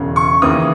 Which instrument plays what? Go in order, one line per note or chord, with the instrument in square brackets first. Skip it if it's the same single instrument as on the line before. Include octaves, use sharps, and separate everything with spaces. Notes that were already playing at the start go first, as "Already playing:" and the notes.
Already playing: [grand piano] E1 E2 C#3
C#6
D#2 C#3 E3 D#6